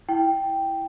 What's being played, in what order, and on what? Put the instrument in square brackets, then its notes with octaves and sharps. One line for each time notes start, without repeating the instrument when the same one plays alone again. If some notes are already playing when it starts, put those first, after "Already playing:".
[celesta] E4 G5